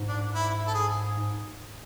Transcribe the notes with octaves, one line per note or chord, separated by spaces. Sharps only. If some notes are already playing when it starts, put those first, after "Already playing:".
Already playing: G#2
D4
E4
A4
G#4